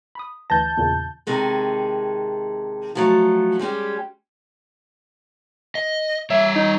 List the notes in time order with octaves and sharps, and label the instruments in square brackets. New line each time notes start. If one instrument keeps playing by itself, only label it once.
[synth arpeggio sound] B5 D#6
[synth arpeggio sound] D2 E3 A#6 [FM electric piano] A5 G6
[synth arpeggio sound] E2 A#2 C#3
[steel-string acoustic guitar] C3 D#3 G#3 A4
F3 F#3 A3
G3 G#3 C#4 G4
[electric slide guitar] D#5
[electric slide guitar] G3 C#5 [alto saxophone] E5
[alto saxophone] D#4